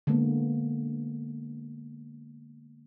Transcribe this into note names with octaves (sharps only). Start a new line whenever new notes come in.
D3 G#3 A#3 B3